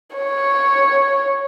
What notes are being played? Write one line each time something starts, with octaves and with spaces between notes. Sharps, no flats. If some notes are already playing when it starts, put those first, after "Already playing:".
C#5